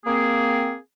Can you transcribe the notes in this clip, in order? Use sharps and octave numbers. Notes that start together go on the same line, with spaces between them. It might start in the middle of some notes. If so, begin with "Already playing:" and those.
A#3 C4 G#4